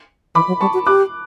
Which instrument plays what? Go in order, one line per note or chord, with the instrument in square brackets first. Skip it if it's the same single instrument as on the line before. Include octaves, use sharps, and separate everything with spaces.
[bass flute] E3 [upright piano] B5 D6
[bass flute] F#3
[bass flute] G3 [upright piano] A5 C#6
[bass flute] F#4
[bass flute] G4 [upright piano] D6 F#6